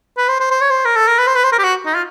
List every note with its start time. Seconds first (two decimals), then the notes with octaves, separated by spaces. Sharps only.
0.17 B4
0.28 C5
0.40 C5
0.51 C5
0.61 C#5
0.70 C5
0.85 A#4
0.96 A4
1.07 A#4
1.18 B4
1.27 C5
1.35 B4
1.44 C5
1.52 A#4
1.58 G4
1.63 F#4
1.86 D#4
1.94 F4